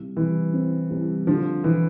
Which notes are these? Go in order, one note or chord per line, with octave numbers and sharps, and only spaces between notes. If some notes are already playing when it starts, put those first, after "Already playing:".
Already playing: C2
C2 E3
C4
C2
D3 F3
E3